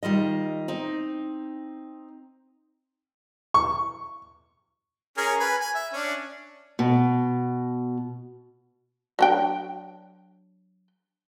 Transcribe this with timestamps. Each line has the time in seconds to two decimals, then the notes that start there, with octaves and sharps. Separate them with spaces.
0.03 D#3 G3 F4 D#5
0.68 C4 D#4
3.54 C#6
5.17 C#4 G#4 A#4
5.40 B4 G#5
5.61 G#5
5.75 E5
5.93 C#4 D4
6.79 B2
9.19 F#3 D4 G5